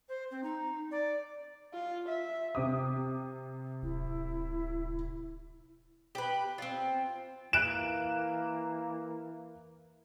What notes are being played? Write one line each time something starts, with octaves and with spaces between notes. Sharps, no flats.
C5
C4
D#4
D5
F4
E5
C3 D6 D#6
D1 E4
G4 B4
C4 F4
E3 A#3 F#6 D7 E7